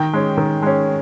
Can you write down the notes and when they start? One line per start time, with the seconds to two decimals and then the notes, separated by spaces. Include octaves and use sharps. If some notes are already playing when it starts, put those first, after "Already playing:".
Already playing: D#3 G5
0.13 G#3 C#4
0.37 D#3
0.63 G#3 C#4